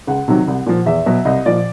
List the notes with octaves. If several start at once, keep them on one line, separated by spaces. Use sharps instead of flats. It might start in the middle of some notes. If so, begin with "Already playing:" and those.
C#2 F#5
C3 D#3 F#3
C2
A#2 F3
E2 E5
B2 F#3
C2 D#5
A#2 F3 D5